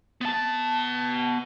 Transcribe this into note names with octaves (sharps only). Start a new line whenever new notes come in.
B3 A5